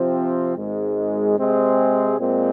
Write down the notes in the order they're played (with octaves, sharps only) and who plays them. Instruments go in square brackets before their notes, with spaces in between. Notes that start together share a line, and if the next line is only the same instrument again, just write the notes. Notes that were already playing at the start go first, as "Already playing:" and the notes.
Already playing: [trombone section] C3 F3 C4
G#1 G#2 G#3
C3 G#3 C4 G#4
A#2 G#3 C4